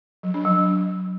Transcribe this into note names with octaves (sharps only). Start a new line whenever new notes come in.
F#3
D4
F#3